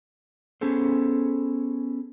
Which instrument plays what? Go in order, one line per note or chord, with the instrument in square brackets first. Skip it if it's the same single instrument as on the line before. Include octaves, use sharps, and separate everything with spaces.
[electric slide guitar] B3 C#4 G#4 A4 C5